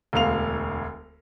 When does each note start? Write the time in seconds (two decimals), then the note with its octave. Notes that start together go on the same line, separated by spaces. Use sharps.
0.13 E1 D2 F5 F7